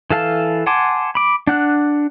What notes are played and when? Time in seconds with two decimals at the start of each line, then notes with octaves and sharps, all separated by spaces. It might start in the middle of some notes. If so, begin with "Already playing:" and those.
0.11 E3 A4 F5 A5
0.67 F#5 G#5 A5 C6 D6
1.15 B5 D6
1.47 D4 F#5 F#6